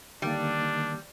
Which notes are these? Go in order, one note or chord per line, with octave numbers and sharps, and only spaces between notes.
D3 D#3 G3 A#3 D4